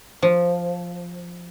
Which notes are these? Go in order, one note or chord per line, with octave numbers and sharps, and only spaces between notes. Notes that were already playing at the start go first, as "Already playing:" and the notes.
F3